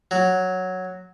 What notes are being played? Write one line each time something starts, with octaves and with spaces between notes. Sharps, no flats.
F#3